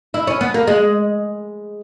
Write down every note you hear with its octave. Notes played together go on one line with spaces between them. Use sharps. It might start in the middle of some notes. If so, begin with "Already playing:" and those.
E4
C#4
B3
A#3
G#3